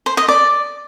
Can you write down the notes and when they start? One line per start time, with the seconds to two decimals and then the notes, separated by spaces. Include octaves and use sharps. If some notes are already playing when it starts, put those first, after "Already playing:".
0.06 C5
0.17 D#5
0.28 D5